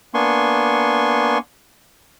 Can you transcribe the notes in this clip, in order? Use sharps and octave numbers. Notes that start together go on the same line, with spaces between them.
A#3 B3 D4 G#5 C6 C#6